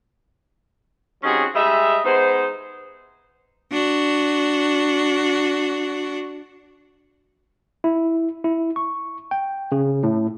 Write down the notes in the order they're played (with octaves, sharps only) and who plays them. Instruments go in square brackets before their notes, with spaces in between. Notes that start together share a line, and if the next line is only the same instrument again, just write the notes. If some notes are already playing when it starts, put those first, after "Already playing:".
[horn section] C3 F#3 C#4 D#4 F#4 G#4
G3 G#3 D#5 E5
G#3 B3 D#4 C5
[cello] D4 F#4
[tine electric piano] E4
E4
C#6
G5
C#3
A2